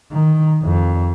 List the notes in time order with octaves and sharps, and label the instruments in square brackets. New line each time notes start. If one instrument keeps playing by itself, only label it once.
[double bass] D#3
F2